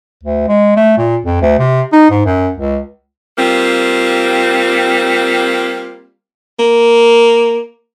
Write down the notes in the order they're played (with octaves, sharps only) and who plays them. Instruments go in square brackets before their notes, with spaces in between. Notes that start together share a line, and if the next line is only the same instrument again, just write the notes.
[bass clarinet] D2
G#3
A3
A#2
F2
D2
C3
D#4
G#2
F#2
C#2
[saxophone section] G3 A#3 C4 F4
[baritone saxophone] A#3